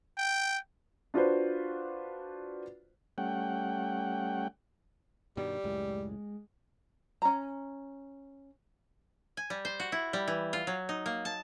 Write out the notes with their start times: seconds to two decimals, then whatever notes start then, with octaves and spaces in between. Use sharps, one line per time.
0.18 G5
1.14 D4 F4 F#4 B4 C5
3.18 G3 A3 C#4 F#5 G5
5.37 G2 B2 D#3 G3
5.64 C#2 F#2 A2 G#3
7.22 C#4 A#5
9.37 G#5
9.50 G3
9.65 C5
9.80 F#4
9.92 E4
10.13 G3
10.27 E3
10.53 F4
10.67 F#3
10.89 D#4
11.06 A#3
11.25 A5